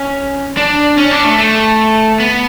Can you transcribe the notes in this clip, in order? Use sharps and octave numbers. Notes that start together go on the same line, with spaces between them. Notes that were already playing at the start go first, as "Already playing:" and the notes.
Already playing: C#4
D4
C#4
D4
A3
A3
B3